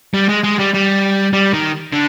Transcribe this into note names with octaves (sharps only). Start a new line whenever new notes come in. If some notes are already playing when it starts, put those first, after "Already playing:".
G3
G#3
G#3
G3
G3
G3
D#3
D3